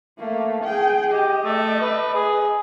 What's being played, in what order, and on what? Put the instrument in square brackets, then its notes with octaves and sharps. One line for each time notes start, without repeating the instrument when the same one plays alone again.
[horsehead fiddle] A3 A#3
G#4 G5
[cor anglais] G4 [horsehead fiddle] D#5
[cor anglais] A3
B4
G#4